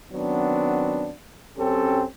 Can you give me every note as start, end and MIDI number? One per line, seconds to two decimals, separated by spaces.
0.12 1.12 51
0.12 1.12 54
0.12 1.12 59
0.12 1.12 60
0.12 1.12 62
1.58 2.04 42
1.58 2.04 60
1.58 2.04 61
1.58 2.04 67
1.58 2.04 69